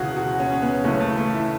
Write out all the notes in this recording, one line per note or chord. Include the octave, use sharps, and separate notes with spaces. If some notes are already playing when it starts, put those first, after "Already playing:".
Already playing: E1 D2 C#3 E3 F#4 G#4
F#4
C#4
C#4
B3
F#1 F#2 C#3 E3 A3
A3
A3
E4